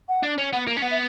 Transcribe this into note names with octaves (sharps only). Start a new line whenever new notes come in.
F#5
D4
C#4
B3 F#5
A#3
C#4
B3 F#5
E5